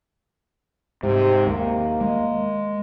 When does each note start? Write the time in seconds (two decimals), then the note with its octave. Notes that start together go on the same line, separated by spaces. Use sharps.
1.03 G#2 C3
1.47 D#2 A#3
2.01 G#3